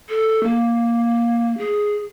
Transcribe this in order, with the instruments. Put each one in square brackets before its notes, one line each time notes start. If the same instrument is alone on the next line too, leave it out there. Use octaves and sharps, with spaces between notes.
[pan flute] A4
A#3
G#4